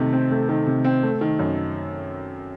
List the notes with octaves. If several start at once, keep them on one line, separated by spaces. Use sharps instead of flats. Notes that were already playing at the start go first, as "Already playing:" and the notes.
Already playing: C3 D#3 A3
C4
A3
D#3
C3
C4
A3
D#3
F#2